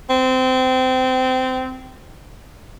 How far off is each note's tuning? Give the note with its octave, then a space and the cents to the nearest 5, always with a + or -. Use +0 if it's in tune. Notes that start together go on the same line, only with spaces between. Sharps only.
C4 -20